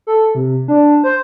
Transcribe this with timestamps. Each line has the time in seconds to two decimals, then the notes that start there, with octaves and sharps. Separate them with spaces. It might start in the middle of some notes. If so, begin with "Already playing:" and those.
0.07 A4
0.35 C3
0.68 D4
1.04 C5